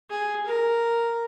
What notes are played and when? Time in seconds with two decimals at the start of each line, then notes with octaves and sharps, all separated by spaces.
0.10 G#4
0.46 A#4